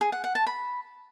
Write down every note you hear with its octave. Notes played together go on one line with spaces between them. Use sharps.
G#4
F#5
F#5
A5
B5